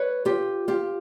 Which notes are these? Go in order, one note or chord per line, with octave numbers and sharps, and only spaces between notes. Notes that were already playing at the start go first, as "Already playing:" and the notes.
Already playing: B4 C#5
F4 G4
F4 G4